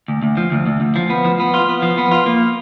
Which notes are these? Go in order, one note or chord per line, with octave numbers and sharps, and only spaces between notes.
D2
D2
F3
D2
D2
D2
F3
B3
F3
B3
F4
B3
F3
B3
F4
A#3